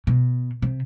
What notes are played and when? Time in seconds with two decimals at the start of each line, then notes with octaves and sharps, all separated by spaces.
0.07 B2
0.62 C3